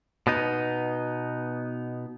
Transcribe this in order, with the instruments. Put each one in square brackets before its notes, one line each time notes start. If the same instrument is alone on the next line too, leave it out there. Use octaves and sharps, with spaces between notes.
[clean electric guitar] B2 B3 D#4